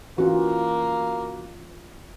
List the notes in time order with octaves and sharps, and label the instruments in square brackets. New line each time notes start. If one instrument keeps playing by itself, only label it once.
[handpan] E3 C#4 F4 [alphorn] A#3 [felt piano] F#4